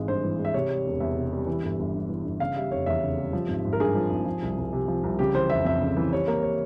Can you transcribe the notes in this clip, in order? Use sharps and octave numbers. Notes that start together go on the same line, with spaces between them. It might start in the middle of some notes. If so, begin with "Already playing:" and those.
Already playing: G#1 E3 G#3
G2 C5
E3
G#3
E5
C3 C#5
G3
E1
E2 E5
C3
G3
E3
G1
G1
G2
E3
G1
C#3 F5
G3 E5
F1 C#5
E2 E5
C#3
G3
F3
G#1
G#1
A#4
G2 G#4
F3
G#1
F3
C2
C2
C3
F3
C2
C#3 G4
E3 C5
F1 E5
F2 E5
C#3
E3
G3 C#5
A#3 A#4
C#5